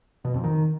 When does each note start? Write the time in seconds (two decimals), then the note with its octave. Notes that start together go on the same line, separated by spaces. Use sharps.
0.25 B2
0.34 F2
0.44 D#3